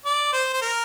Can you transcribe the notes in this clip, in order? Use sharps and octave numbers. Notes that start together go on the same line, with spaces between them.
D5
C5
C5
A#4